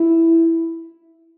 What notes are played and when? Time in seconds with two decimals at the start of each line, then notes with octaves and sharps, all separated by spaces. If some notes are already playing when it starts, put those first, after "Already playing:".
Already playing: E4